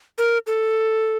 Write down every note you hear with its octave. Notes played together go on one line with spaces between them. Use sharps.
A#4
A4